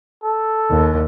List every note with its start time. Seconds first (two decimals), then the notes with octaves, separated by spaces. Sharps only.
0.24 A4
0.70 D#2